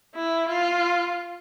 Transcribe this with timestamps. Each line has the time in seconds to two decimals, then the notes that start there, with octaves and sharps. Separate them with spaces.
0.15 E4
0.49 F4